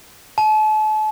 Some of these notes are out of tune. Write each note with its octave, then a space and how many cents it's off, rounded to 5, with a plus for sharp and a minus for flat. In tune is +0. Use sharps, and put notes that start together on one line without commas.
A5 -40